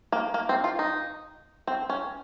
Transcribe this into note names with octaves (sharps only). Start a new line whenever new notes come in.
A#3
A#3
C4
F4
D#4
C4
C#4